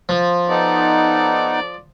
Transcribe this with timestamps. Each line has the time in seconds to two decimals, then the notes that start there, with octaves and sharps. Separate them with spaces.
0.09 F3
0.48 B3 D#4 A4 D5